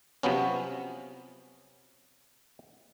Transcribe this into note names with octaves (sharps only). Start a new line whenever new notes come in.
C3 F3 F#3 B3 C#4